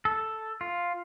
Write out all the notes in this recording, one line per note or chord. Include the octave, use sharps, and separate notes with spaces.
A4
F4